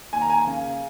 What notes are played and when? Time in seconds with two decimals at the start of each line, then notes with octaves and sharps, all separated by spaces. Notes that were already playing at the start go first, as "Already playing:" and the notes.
0.13 D#2 G#5
0.21 A#5
0.30 G#5
0.47 C#3